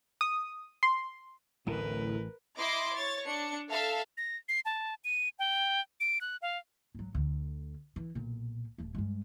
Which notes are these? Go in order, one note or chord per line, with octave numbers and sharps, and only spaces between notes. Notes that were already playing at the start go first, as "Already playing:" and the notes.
D#6
C6
D1 A1 A2 E3 A#4 B4
E4 D#5 C6 D6 A#6
C#5 A6
D4 C#7
A4 E5 F5 A5
A#6
C7
A5
D#7
G5
D7
F#6
F5
G#1 F#3
D2 D3
E3
B1 A#2
D#1 A3
G2 G#3